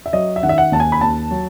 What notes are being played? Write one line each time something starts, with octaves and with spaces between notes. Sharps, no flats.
E5
F#3 D#5
E5
D#3 F#5
E5
F#5
D#2 A5
G#5
B5
D#2 A5
F#3